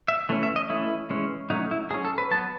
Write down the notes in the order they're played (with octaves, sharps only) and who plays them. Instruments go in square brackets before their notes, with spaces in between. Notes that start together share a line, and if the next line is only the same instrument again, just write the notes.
[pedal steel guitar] E5
E3 A3 C#4
E5
D#5
E3 A3 C#4 E4
E3 G#3 C#4
F#3 A3 C#4 D#4
E4
F#3 G#4
C#4
A4
B4
F#3 B3 A5